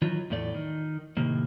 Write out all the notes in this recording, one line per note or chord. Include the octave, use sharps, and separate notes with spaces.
D#3 E3 F#3 F4
E2 A2 A3 D5
D#3
A2 C3 D#3 A#3